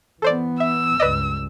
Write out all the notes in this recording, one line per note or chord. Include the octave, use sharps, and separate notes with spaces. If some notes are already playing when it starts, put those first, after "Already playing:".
E3 B3 A4 C5 D5
E5 E6
C#2 G2 B4 D5 D#5